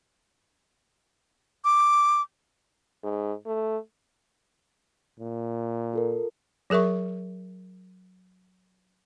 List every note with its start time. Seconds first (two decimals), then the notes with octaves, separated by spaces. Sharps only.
1.64 D6
3.04 G#2
3.46 A3
5.20 A#2
5.93 F4 A4 A#4
6.70 F#3 G#4 A#4 E5 C#6